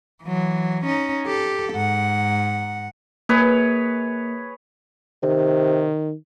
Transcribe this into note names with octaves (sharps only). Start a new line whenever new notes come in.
E3 F#3
C#4 D#4
G4 A4
G#2 F#5
A#3 G#4 B4 C#5
C3 D#3